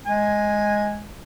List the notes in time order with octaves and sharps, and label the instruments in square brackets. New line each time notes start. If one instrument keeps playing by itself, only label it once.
[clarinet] G#3 [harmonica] G#5